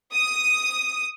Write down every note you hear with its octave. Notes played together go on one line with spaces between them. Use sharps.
D#6